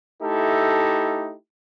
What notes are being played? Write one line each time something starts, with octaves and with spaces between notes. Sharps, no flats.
A3 D#4 E4 G4 A4